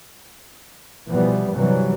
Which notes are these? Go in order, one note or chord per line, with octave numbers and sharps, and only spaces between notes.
B2 E3 F3 G3 B3
G2 C3 E3 F#3 G3